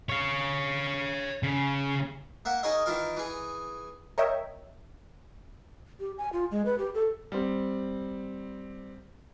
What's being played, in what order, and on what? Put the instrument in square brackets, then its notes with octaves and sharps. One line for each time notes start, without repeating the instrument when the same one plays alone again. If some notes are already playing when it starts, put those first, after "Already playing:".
[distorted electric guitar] C#5 F5
C#3
[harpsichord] A#3 E5 F#5
D#4 G#4 A#4 C#5 D#5 E5
D#3 E3 F4 A#4
E3 G#4
[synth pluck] A#4 C#5 D#5 E5 G5
[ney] G4
G#5
F4
G#3
B4
G4
A4
[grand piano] G3 C4